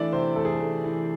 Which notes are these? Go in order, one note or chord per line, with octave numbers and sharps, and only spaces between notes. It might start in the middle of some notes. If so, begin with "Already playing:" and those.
Already playing: E3 A3 D4 D5 E5
C3 C5
A3 A4
G#4
A4
A3
E3